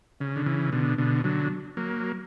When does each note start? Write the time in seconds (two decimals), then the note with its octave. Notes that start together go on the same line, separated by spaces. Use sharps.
0.20 C#3
0.36 D3
0.46 C#3 E3
0.72 B2 D3
0.98 B2 D3
1.24 D3 F#3
1.77 F#3 A#3